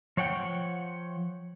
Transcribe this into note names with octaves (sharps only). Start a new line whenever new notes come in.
F3 C#5 F#5 G5